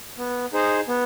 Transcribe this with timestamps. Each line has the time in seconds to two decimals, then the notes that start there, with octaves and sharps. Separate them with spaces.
0.18 B3
0.53 D#4 G#4 C5
0.88 B3